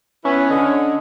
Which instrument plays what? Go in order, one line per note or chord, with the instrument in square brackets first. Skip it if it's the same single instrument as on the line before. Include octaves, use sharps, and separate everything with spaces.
[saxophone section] B3 E4 B4 [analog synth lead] C#4
[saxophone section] D3 D#5